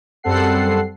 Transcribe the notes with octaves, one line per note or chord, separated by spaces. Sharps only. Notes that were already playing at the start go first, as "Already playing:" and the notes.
F#2 G3 C4 A4 F#5 C7